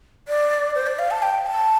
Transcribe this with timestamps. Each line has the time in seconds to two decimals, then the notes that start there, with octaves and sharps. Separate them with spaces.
0.28 D5
0.75 C5
0.87 D5
0.99 F5
1.11 A5
1.22 G5
1.46 A5